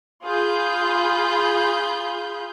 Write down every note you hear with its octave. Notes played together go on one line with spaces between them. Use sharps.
F4 G#4 B5 G6